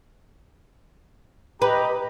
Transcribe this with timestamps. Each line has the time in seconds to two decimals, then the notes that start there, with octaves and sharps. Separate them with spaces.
1.62 G4 B4 D#5 A#5